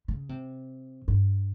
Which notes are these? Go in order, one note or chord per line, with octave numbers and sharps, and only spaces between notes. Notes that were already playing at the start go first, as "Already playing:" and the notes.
C#3
C3
G2